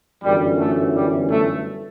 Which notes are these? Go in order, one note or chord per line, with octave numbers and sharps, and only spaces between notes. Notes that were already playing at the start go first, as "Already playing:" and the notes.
G1 F#2 E3 G3
A3
G3
A3